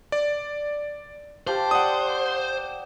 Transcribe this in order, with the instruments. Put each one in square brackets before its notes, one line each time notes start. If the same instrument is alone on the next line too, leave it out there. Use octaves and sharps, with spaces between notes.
[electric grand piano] D5
[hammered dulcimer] G4 F5 A5 [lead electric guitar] C5
[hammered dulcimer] D5 [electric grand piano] F#5 D#6